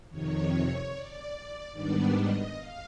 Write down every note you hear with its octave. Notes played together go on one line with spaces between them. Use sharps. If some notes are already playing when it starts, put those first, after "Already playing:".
F2 C3 D#3 C#5
D5
G#2 D#3 G3 B3 D4 D5
D#5
F5